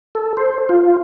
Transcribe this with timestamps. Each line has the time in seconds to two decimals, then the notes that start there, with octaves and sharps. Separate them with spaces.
0.15 A4
0.37 C5
0.69 F4